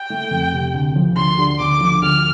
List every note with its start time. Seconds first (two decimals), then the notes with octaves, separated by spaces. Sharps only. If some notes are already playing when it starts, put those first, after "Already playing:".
Already playing: G5
0.10 A3
0.31 F2
0.52 C3
0.74 D2
0.96 F3
1.16 D2 C6
1.39 D3
1.59 D2 D6
1.81 F3
2.02 D2 F6